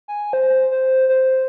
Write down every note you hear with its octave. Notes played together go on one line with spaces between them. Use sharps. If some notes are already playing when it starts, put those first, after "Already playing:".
G#5
C5
C5
C5